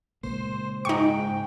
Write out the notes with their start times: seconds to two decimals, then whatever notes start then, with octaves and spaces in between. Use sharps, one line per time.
0.23 C#2 A#2 A#3 C5
0.85 G#2 D#4 G5 C#6